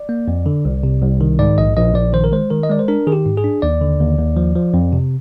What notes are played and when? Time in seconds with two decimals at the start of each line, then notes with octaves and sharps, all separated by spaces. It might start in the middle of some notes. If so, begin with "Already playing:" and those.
Already playing: D5
0.09 A#3
0.28 F2
0.46 D3
0.65 C2
0.83 C3
1.02 C2
1.21 D#3
1.39 G#2 D5
1.58 A#1 D#5
1.77 A#1 D#5
1.95 A#1 D5
2.13 D#3 C5
2.24 A#4
2.32 G#3 C5
2.50 D#3 A#4
2.63 D#5
2.69 G#3 D5
2.79 C5
2.88 D4 A#4
3.07 D#3 G#4
3.12 G4
3.25 G#2
3.37 G#4
3.44 D4
3.62 D#2 D5
3.81 D3
4.00 D#2
4.18 D#2
4.37 F3
4.55 F3
4.74 F2
4.92 C3